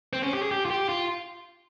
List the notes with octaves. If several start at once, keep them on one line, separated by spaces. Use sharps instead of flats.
C4
C#4
G4
G#4
G4
F4
G4
F4